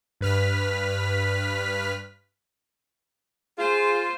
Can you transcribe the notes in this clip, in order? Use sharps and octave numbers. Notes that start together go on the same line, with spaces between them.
G2 B4 F6 B6
F4 G#4 C5